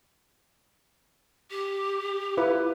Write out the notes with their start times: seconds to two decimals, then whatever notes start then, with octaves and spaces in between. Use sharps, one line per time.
1.50 G4
2.37 E4 F4 B4